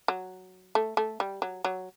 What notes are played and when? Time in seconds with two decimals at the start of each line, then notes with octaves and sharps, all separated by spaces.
0.08 F#3
0.75 A3
0.97 A3
1.20 G3
1.42 F#3
1.64 F#3